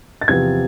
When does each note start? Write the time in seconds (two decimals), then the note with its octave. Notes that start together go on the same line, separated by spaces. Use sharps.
0.21 A6
0.28 E2 C3 F3 B3 G#6